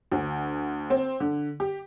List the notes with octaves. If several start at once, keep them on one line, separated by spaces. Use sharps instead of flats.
D2
C4
D3
G4